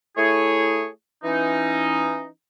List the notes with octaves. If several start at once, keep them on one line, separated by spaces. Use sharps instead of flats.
A3 E4 G#4 C#5
E3 C#4 D#4